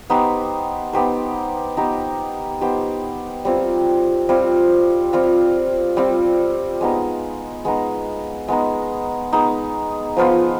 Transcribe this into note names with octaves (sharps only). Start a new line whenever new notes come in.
B3 D#4 G4 C5
B3 D#4 G4 C5
B3 D#4 G4 C5
B3 D#4 G4 C5
G3 C4 F4
G3 C4 F4
G3 C4 F4
G3 C4 F4
G#3 B3 D#4
G#3 B3 D#4
G#3 B3 D#4
G#3 B3 D#4
F3 B3 F4 C5